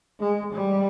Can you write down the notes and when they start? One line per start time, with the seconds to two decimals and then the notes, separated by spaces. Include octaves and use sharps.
0.20 G#3
0.53 G3